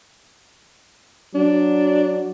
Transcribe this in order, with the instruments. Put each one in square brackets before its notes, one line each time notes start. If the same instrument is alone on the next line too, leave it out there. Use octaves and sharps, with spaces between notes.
[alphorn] F#3 [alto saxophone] D4